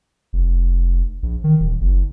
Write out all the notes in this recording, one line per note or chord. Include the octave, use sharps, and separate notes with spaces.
F1
A#1
D#3
D#1
F#1